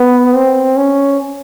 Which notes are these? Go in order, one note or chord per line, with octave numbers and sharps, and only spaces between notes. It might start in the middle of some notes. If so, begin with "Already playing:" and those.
Already playing: B3
C4
C#4